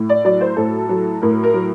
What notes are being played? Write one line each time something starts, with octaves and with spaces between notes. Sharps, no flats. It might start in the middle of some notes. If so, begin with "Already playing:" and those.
Already playing: A2
D5
F#3 D5
C5
A2 A4
F#3
A2 A#4
A#4
F#3